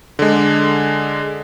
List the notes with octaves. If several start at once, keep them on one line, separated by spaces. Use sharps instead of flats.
D3 G#3